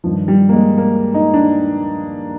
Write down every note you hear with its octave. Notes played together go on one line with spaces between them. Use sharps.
G2 D#3 F3
G3
A#3
G#3
A#3
D#4
D4